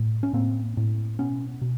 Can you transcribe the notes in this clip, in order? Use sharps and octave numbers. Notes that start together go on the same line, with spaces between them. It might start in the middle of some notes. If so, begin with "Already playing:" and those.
Already playing: A2
C#4
A2 A#3 C4
A2
B2 B3 C#4
B2